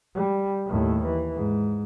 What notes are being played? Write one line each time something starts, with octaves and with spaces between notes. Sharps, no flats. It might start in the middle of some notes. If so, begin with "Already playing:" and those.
G3
D#2 A2
E3
G#2